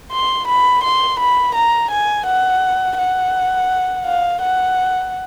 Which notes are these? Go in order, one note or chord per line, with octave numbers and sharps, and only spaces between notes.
C6
B5
C6
B5
A#5
G#5
F#5
F#5
F5
F#5